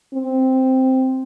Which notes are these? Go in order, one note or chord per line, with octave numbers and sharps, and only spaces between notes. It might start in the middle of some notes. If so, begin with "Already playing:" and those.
C4